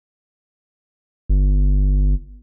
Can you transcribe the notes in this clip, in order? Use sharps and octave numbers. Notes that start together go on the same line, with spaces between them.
G1